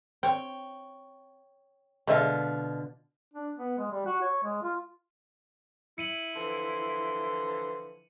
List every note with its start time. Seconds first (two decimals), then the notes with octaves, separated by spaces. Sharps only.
0.23 C4 C#5 G5
2.07 B2 D3 G#3 F4 C5 E5
3.34 D4
3.58 B3
3.78 G#3
3.91 G3
4.06 F#4
4.22 C#5
4.44 G#3
4.63 F4
5.98 E4 C#7 D#7 F#7
6.36 D3 E3 F3 C6